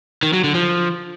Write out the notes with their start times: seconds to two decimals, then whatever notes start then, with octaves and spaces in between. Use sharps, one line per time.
0.23 D#3
0.33 F#3
0.44 D3
0.55 F3